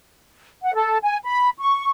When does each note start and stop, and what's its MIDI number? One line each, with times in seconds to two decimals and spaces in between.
0.62 0.74 78
0.74 0.97 69
1.02 1.17 80
1.25 1.49 83
1.58 1.90 85